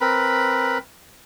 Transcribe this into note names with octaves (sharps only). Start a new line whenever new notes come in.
C4 A#4 B4 B5